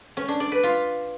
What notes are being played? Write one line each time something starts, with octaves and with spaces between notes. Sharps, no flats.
C#4
D4
D5
B4
F4